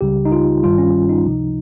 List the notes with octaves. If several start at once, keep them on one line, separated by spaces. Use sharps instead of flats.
C#2 C#3 G3 G4
D#4
F4
G1 G2 D#3 G3 F4
C#4
D#4
C#2 C3 F3